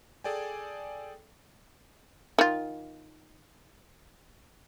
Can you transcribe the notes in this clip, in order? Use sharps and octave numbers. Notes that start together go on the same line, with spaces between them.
G#4 A4 D5 G5 G#5
D#3 F4